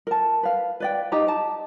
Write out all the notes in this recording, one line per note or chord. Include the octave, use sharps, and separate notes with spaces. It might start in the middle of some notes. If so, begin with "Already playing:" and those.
A#4 A5
B4 F5
B4 D5 G5
D#4 G4 C5 A#5
A5 A#5